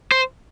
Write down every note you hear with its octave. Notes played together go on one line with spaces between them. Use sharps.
C5